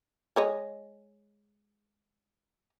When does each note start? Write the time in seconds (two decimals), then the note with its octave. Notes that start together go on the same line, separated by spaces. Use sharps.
0.36 G#3 C#5 D#5